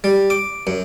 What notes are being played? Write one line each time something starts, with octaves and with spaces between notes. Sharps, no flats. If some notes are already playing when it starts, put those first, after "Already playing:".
G3
D6
F#2